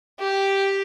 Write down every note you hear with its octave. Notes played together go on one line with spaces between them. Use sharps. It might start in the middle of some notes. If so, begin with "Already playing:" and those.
G4